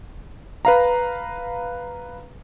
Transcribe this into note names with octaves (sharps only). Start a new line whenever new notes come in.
B4 F5 A#5